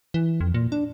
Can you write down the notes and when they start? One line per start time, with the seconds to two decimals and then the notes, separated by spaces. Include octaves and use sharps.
0.14 E3
0.41 F2
0.54 A#2
0.72 D4